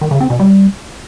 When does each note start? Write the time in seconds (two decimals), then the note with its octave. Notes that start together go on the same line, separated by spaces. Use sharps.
0.01 D#3
0.11 C#3
0.21 C4
0.30 B2
0.40 G3